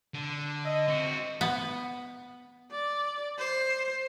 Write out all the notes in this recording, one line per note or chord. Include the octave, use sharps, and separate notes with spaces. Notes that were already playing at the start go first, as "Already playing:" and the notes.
D3
D#5 E5
C4 F#4
B3
D5
C5